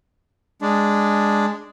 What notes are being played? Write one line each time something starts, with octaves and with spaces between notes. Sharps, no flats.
G#3 D4